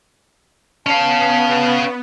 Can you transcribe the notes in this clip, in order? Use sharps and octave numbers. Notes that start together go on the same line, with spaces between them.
B3 C#4 F5 A5